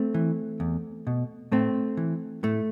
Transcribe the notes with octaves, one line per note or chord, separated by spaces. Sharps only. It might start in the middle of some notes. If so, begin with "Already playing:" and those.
Already playing: A3 C4
E3
E2
B2
A2 A3 C4
E3
A2 A3